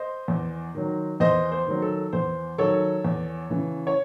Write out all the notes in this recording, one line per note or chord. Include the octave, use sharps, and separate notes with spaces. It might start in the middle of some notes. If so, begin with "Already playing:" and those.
Already playing: C5 D#5
E2
D#3 F#3
E2 C5 D#5
C5
D#3 F#3
A4
E2 C5
D#3 F#3 A4 C#5
E2
C#3 E3
C#5